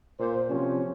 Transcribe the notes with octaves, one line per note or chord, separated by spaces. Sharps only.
A#2 A#3 C5
C3 F3 F#3 C#4